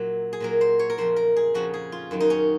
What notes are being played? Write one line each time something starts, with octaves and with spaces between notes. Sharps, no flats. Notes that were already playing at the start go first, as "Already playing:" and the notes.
Already playing: A#2 F#3
G#4
A#2 F#3 A#4
C5
C#5
A#4
F2 C#3 F3 C5
A#4
G#4
F2 C#3 F3 F#4
G#4
F4
F#2 D#3 F#3
D#4
C#4